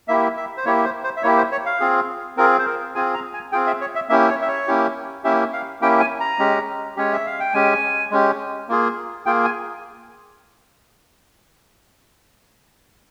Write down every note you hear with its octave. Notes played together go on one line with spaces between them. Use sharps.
A#3 E4 G4 E5
E5
C5
A#3 E4 G4 C#5
C5
C5
E5
A#3 E4 G4 C#5
C5
C#5
F5
C4 F4 G#4
C4 F4 G#4 A#4
C5
A#4
C4 F4 G#4 G#5
A#5
G#5
C4 F4 G#4 G5
E5
C#5
E5
A#3 C#4 E4 G4 E5
C#5
E5
C#5
A#3 C#4 E4 G4
A#3 C#4 E4 G4 E5
F5
A#3 C#4 E4 G4 G5
G#5
A#5
G#3 C#4 G4
G#3 C#4 G4 C#5
E5
F5
G5
G#3 C#4 G4 G#5
G#3 C#4 G4
A#3 F4 G#4
A#3 F4 G#4 G5
G#5